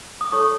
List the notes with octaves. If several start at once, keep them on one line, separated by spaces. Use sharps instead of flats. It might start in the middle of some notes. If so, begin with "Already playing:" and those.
D#6
D#4 A4 C#5 C#6